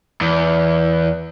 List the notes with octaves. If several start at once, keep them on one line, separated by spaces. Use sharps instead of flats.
E2